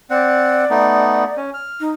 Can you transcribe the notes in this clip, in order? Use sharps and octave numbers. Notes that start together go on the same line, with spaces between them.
C4 D5 F#5
A3 B3 D#4
C#4
F6
D#4